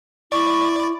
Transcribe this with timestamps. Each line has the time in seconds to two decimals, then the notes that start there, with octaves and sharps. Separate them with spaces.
0.32 E4 D5 C#6